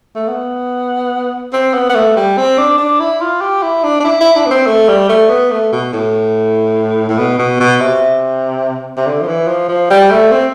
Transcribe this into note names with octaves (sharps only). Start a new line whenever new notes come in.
A3
B3
C4
B3
B3
A3
G3
C4
D4
D4
E4
F4
G4
E4
D4
D4
E4
E4
D4
B3
C4
A3
G3
A3
B3
A3
B2
A2
A2
B2
B2
B2
C3
C3
D3
F3
E3
F3
F3
G3
A3
C4